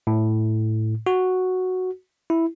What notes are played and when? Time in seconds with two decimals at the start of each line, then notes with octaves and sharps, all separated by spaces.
0.07 A2
1.07 F#4
2.30 E4